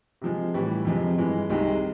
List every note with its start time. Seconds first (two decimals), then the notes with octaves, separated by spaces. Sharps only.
0.22 C3 F3 G#3
0.54 A2 E3 G3
0.85 F2 C3 F3 G#3
1.18 G2 E3 G#3
1.50 C2 C3 D#3 G#3